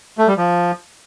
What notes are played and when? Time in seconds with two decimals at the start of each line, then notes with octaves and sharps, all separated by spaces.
0.18 A3
0.28 G3
0.37 F3